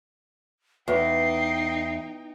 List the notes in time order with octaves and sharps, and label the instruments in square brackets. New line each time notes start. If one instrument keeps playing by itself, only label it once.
[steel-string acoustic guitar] E2 [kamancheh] D#4 G5 [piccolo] C7